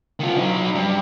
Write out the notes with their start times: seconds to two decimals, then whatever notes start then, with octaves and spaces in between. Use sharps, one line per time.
0.20 D#3 F4
0.37 F#3 D#4
0.75 G2